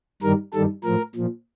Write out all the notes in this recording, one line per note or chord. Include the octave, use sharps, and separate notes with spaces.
G2 D#3 G3 A#4
G2 D#3 G3 A4
A2 F3 A#4
A#2 F3